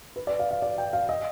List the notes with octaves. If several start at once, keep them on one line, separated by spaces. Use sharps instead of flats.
B4
D5
F5
F5
D5
G5
F5
D#5